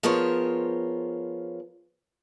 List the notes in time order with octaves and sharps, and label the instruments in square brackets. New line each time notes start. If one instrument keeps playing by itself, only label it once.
[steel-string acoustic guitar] F3 B3 G#4 A#4 C5 C#5